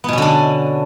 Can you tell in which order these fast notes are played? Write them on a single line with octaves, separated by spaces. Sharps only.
B3 B2 C#4 D3 D4